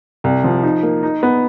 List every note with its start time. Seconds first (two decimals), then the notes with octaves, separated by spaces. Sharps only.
0.24 C2
0.44 F3
0.63 D#4
0.83 A#3
1.03 D#4
1.23 B3